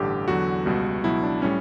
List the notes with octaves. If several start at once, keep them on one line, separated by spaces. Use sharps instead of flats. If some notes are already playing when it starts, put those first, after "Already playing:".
Already playing: A1 G2 D3 G4
E2 D3 F#3 F#4
C#2 B2 G3
C#2 B2 F#3 E4
D4
A2 G3 C#4